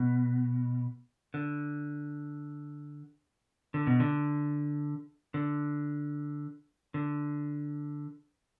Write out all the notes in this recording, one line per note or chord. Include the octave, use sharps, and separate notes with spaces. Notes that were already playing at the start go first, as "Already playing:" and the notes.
Already playing: B2
D3
D3
B2
D3
D3
D3